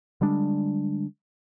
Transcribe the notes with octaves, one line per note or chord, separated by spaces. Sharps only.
D3 G3 G#3 D4